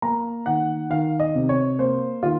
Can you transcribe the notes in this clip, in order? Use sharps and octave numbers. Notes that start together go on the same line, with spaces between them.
A#3 A#5
D#3 F#5
D#3 F5
D#5
C3
C#5
A#3 C5
D#3 F4